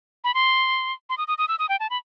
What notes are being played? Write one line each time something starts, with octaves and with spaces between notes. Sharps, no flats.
B5
C6
C6
D#6
D#6
D#6
E6
D#6
G5
A5
B5